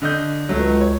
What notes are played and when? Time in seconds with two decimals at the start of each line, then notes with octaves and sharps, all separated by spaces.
0.02 D3 D#5 G6
0.49 C#2 F#3 A3
0.81 C#5